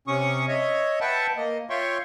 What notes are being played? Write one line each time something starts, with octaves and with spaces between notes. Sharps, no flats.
C3 C#4 C#6 D#6
C#5 D#5 E5
B4 E5 F#5 G5 A5
A#3 D#5
F4 C#5 E5 G5 C6 C#6